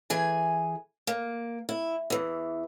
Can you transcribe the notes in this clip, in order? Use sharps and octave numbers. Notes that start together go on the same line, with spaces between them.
E3 G#4 G#5
A#3
E4
E2 E3